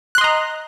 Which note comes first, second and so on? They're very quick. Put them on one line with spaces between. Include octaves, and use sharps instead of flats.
F#6 C6 D#5 A#5